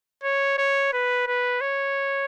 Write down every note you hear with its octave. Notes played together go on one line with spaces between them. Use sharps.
C#5
C#5
B4
B4
C#5